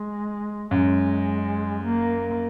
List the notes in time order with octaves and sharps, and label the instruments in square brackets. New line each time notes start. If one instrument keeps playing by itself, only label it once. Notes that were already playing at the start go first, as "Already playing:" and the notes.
Already playing: [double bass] G#3
[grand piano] F#2 [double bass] G#3
[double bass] A#3